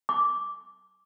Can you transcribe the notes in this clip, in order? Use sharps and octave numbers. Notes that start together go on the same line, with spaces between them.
D6